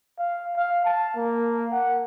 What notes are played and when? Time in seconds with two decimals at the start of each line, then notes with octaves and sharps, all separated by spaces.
0.19 F5
0.56 F5
0.85 A5
1.16 A#3
1.72 F#5